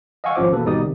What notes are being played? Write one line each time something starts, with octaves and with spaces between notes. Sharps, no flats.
D#5 F5 F#5 G#5 C#6 E6
G#1 F3 C#4 F4 C5 D6
B2 E3 A#3 A4 B4
G#1 B2 G3 D#4 D5 D#6
C3 D#3